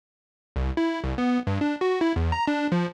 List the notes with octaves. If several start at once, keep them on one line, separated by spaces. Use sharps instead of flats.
C2
E4
C2
B3
G2
D4
F#4
E4
E2
A#5
D4
F3